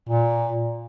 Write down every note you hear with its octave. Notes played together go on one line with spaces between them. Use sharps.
A#2